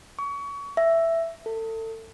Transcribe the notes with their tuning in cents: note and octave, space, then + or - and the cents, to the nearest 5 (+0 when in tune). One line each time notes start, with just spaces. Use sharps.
C#6 +30
E5 +5
A4 +30